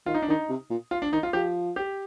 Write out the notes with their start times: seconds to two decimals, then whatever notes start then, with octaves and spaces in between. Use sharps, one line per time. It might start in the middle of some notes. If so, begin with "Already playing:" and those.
0.06 D#3 F4
0.14 D#4
0.22 D4
0.28 D#3 D#4
0.49 C3
0.70 A#2
0.91 F4
1.02 D4
1.12 D#3 D#4
1.23 F4
1.33 F3 G4
1.76 G4